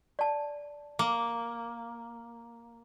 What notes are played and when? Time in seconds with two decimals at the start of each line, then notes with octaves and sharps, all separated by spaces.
0.19 D5 A5
0.99 A#3 D6